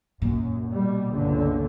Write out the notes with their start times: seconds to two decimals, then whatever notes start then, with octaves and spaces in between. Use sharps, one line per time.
0.22 F#2 A#2
0.71 B2 G3
1.11 G1 C#2 D3